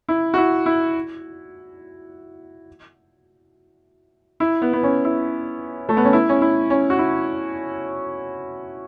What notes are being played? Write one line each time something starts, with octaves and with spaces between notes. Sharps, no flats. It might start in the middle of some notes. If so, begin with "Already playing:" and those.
E4
F#4
E4
E4
E4
B3
B3
C#4
E4
A3
B3
C#4
E4
C#4
E4
C#4
F#4
E4